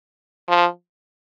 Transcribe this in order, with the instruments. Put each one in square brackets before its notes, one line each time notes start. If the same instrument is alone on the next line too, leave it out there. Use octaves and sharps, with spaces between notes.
[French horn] F3